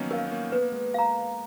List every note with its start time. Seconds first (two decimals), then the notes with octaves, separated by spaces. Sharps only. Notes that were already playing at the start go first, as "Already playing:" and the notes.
Already playing: D#3 F3 F#3 A#3 B3 C#4 D#4
0.11 A#4 F5
0.26 B3
0.32 A#3 C#4
0.52 B3 B4
0.62 A#3
0.72 G#3 B3
0.94 F5 A#5